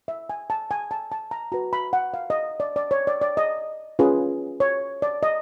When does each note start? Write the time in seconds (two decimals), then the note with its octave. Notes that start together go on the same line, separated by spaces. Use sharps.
0.08 E5
0.30 G#5
0.50 A5
0.71 G#5
0.91 A5
1.12 A5
1.31 A#5
1.52 F#4 B4 A#5
1.73 B5
1.93 F#5
2.14 F5
2.30 D#5
2.60 D5
2.76 D5
2.91 C#5
3.07 D5
3.21 D5
3.37 D#5
3.99 C#4 F4 G#4 B4
4.60 C#5
5.02 D5
5.23 D#5